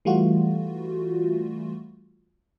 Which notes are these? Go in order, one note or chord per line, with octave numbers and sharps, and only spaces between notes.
E3 G3 A3 F4 F#4